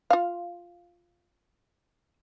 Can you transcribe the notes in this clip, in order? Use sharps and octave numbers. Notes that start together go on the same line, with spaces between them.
F4 F5